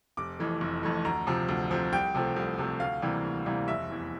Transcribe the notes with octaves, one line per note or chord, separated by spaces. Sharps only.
F1 D6
F2 E3 A3
F1
F2 E3 A3
D2 A#5
C3 F3
D2
C3 F3
C2 G5
C3 F3 A3
C2
C3 F3 A3
D2 F5
C3 E3 G3 A#3
D2
C3 E3 G3 A#3
F1 E5
E2 E3